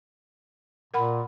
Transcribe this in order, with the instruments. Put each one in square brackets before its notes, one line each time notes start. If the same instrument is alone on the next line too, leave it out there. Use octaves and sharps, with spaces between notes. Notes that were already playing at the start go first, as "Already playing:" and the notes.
[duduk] A#2 [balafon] A#4 F#5 B5